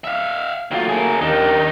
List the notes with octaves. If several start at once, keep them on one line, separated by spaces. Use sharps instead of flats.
E5 F5
D#3 F#3 A3 A#3 F4
G#4 A#4
D#2 D#3 D4 D#4